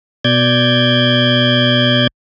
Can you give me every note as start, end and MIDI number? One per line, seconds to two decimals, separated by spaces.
0.24 2.07 47
0.24 2.07 74
0.24 2.07 91
0.24 2.07 92